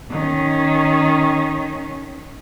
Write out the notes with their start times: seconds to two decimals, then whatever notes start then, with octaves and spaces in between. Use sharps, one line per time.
0.10 D#3 C#4